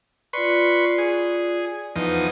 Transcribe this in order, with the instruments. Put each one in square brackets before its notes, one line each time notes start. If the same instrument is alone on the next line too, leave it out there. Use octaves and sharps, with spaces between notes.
[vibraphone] F4 D5 [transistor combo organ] B4 C6 C#6
[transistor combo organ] G#4
[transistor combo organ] E2 F3 D#4 [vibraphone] B4 D#5 F#5